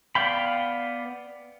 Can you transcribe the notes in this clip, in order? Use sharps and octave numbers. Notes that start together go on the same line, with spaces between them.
B3 D5 F5 G5 B5